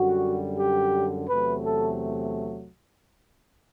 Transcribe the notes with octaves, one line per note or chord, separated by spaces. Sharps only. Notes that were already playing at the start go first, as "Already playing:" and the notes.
Already playing: F#2 D3 G3 F#4
G4
E2 C3 F#3 A3 B4
A4